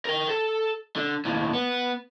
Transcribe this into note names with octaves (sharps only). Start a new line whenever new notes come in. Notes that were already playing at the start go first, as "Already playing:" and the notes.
A#4 G5
A4
D3
D#2 A2
B3